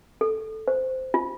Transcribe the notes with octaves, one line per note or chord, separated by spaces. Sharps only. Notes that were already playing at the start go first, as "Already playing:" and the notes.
A4
C5
F4